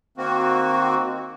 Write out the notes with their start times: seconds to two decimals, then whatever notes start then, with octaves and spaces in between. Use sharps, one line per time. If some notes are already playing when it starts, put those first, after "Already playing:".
0.18 D#3 A#3 C4 F#4